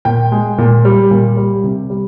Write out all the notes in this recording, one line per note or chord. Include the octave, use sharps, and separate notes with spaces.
A#2 G5
G#3
A#2
G3
A#2
G3
C3
G3